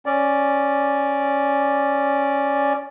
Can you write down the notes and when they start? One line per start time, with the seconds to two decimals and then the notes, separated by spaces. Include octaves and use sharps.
0.06 C#4 D5